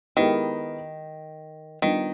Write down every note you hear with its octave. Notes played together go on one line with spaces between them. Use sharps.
D#3 G#3 B3 E4 G4 A#4
D#3 G3 B3 D4 F4